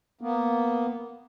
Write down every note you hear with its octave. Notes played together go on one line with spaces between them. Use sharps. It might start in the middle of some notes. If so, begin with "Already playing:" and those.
A#3 B3